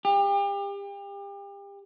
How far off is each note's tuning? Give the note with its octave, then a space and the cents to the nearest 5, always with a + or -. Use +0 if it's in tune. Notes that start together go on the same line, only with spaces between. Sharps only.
G4 +35